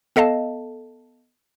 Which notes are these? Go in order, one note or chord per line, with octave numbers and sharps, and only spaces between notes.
B3 A4 D#5 F5 A5